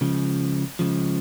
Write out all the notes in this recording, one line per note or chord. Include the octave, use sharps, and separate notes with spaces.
C#2 C#3 F3
C#2 C#3 F3